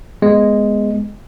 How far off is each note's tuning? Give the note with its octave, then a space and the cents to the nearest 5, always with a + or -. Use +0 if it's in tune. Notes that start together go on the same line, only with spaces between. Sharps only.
G#3 +0 B3 +0